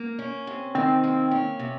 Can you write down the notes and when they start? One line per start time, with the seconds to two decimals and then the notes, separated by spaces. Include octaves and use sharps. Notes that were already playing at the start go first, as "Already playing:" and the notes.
Already playing: A#3
0.19 C#4
0.47 C3
0.75 D#3 C4
1.04 A#3
1.31 C#4
1.59 C3